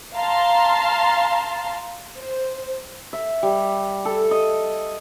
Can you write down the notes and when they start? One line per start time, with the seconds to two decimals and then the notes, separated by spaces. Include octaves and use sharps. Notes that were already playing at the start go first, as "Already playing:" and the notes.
0.16 F5 A5 A#5 C6
2.18 C5
3.13 E5
3.43 G3
4.05 A4
4.31 D#5